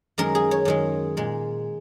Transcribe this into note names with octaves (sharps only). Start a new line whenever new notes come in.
F#2 D#3 G#3 A#4
G#4
C#5
F#2 D#3 G#3
A#2 G#3